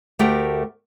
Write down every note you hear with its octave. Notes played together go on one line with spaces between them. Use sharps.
D2 A3 G4 A#4 G5